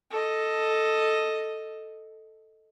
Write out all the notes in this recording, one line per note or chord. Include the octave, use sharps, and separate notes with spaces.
A4 D#5